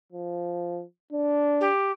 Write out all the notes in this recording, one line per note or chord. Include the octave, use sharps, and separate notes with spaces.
F3
D4
G4